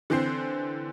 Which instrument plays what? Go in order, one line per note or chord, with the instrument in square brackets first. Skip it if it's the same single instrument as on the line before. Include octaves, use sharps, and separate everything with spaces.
[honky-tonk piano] D3 E3 C4 C5 C7